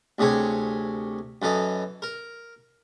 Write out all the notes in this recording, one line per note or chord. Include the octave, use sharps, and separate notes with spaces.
D2 C3 G#4 C#5 G#5
F#2 E3 A4 D#5
A#4